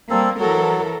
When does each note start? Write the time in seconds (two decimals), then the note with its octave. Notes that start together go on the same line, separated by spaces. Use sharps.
0.10 G3 A#3 C4 A4
0.39 E3 F#3 A4 A#4